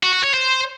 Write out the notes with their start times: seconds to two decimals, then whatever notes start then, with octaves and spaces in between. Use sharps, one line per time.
0.03 F#4
0.13 F#4
0.23 C#5
0.34 C5